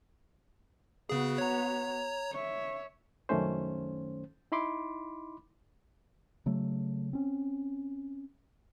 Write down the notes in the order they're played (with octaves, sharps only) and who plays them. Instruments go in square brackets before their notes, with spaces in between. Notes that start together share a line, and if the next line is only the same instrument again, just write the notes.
[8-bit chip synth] C#3 G#4 [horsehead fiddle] B3 F#4
[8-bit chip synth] C#5 A#5
[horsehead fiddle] C#5 E5
[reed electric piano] C2 F#2 D#3 A3 C#4 C5
D#4 E4 B5 C6 D6
[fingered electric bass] C#3 F#3 A3
C4 C#4